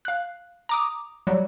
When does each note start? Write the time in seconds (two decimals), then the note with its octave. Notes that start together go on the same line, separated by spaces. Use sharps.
0.05 F5 F#6
0.69 A#5 D6 D#6
1.27 F#3 G3